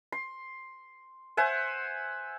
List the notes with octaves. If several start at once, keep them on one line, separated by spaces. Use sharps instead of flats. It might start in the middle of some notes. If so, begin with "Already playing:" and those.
C6
C5 E5 F#5 G#5